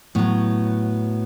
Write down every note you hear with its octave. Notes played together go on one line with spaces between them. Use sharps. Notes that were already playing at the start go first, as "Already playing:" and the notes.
A2 F#3 B3